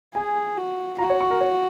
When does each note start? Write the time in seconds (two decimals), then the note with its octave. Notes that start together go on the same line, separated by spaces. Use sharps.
0.15 G#4 G#5
0.57 F#4
0.99 F#4 A#5
1.10 C#5
1.21 C#6
1.31 A#4
1.41 C#5